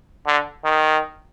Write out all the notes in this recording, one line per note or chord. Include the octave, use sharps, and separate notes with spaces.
D3
D#3